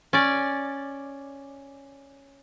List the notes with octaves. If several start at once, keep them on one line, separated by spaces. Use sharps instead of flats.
C#4 D5